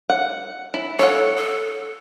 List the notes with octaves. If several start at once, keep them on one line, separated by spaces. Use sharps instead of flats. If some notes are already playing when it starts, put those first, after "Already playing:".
F#5
E4
A4 C#5 F#5
A4